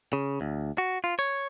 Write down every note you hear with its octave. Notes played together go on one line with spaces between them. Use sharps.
C#3
D2
F#4
F4
C#5